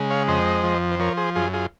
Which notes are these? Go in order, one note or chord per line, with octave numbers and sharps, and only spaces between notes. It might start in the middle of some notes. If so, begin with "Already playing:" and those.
Already playing: C#3 G#3
C#5 F5
F2 C5 D#5
F3
C5
F3 A#4 C#5
G#4 C5
F#2 F4 G#4
F4 G#4